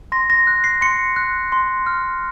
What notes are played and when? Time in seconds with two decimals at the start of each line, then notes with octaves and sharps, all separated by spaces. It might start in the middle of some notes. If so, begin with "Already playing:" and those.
0.12 C6 A#6
0.30 A#6
0.47 F#6
0.64 C7
0.81 C6 C#7
1.16 F#6
1.52 C6
1.86 F6